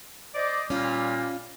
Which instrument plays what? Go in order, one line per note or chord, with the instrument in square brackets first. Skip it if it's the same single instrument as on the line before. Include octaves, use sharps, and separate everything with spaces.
[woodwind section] C5 D5 D#5
[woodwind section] A#2 G3 A#3 [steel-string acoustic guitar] C#4 F4